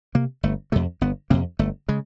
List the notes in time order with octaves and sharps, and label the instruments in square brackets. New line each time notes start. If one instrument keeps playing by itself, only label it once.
[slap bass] C3 A#3
G1 A3
F2 C3 A3
G1 B3
F2 C3 A#3
G1 A3
C#3 G#3